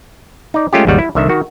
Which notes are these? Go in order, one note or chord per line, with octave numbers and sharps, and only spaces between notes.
D#4 D5
G#3 A3 C#4 F4 G4
G#1 D#2 C#3 G3 F#5
E4
C2 D3 D#3 E5
D#3 F#4